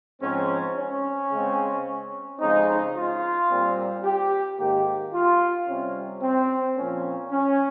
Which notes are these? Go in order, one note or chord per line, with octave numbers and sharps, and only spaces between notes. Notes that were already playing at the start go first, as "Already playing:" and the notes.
G#2 F3 C4 C#4
C#4
C#3 G#3 C4
F2 C#3 G#3 C4 D#4
F4
A#2 G3 C4
G4
G#2 D#3 A#3 G4
F4
C3 G3 C4 C#4
C4
A#2 F3 A#3 C#4
C#4